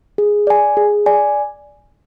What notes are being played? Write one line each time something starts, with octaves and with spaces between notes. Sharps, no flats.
G#4
D5 G#5
G#4
D5 G#5